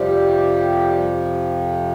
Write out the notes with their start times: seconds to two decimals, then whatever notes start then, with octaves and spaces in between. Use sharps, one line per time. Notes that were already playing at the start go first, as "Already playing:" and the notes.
Already playing: F2 C3 F3 G3 G4